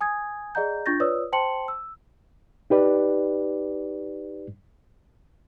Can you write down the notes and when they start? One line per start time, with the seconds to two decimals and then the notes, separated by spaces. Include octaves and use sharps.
0.01 G#5 D#6 G#6
0.55 G#4 D5 D#5 F#5 A#5 G6
0.86 D4 F4 C#6 G6 A6 A#6
1.00 F4 B4 C#5 D5 D#6 E6
1.32 C5 G5 A5 C6 C#7 F#7
1.68 E6
2.70 D#4 G4 B4 D5